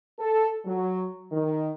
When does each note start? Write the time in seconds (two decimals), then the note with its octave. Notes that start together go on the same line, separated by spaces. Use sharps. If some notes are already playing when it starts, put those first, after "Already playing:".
0.18 A4
0.66 F#3
1.32 D#3